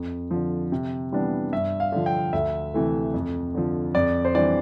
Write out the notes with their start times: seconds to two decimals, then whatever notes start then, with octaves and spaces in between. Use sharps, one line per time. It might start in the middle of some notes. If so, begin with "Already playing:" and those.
Already playing: F2
0.31 D3 F3
0.72 C3
1.12 E3 G3 B3 D4
1.52 G2 E5
1.80 F5
1.92 D3 F3
2.06 G5
2.33 D2 E5
2.74 C3 E3 A3
3.14 F2
3.55 D3 F3
3.94 F2 D5
4.25 C5
4.35 E3 G3 D4 D5